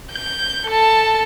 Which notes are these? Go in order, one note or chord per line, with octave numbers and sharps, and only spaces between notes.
G6
A4 A5